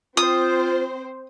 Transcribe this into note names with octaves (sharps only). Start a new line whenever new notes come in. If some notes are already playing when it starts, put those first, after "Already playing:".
C4 F4 C5 D#6